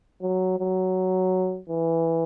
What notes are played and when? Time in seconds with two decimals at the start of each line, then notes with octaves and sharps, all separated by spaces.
0.22 F#3
0.59 F#3
1.70 E3